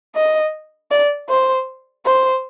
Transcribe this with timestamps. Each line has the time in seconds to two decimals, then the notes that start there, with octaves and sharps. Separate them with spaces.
0.16 D#5
0.91 D5
1.29 C5
2.06 C5